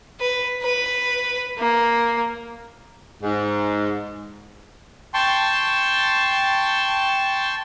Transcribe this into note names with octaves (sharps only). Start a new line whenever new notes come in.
B4
B4
A#3
G#2
G5 A5 C6 C#6